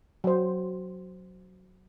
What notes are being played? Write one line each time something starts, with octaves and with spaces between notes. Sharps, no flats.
F#3 C5